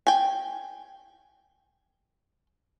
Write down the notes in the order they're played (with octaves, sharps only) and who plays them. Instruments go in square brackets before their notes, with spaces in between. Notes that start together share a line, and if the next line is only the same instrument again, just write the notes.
[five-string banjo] G5 G#5